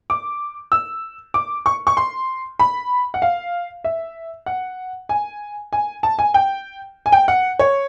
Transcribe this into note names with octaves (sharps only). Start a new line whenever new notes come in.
D6
E6
D6
C#6
C#6
C6
B5
F#5
F5
E5
F#5
G#5
G#5
A5
G#5
G5
G#5
G5
F#5
C#5